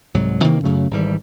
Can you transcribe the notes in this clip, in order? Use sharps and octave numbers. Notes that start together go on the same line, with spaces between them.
C2 G#2 F#3
C3 D#3 E3 A#3
F#2 C#3 F#3 A3
G#1 G#2 E3 G3